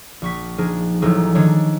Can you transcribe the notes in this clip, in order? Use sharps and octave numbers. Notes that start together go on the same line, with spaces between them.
A#1 C#6 B6
F3 D4 D#4 G#4 A#4
A1 F3 F#3 D#4 G#4
D#3 F3 G#3 D4 C#5